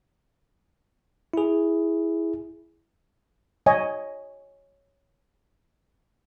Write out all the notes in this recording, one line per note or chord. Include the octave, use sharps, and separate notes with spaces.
E4 G#4
C#5 D#5 G#5